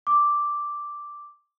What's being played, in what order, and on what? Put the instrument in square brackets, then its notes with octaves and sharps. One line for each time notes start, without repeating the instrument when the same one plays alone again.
[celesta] D6